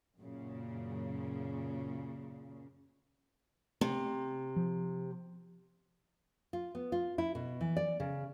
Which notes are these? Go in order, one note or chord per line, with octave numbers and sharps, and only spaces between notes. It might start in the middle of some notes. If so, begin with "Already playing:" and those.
F#2 A#2 C#3
C3 A3
F3
F4
B3
F4
E4
B2
E3
D5
C#3